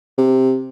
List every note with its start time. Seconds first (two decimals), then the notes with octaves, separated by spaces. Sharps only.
0.18 C3